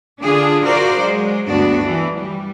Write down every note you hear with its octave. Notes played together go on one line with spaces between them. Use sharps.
D3 D4 F4 G#4
F#4 A#4 C5 D5 F5
F#3 G#3
D2 G2 B3 D4 F#4
E3
G3